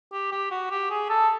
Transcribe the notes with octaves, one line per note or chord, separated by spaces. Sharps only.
G4
G4
F#4
G4
G#4
A4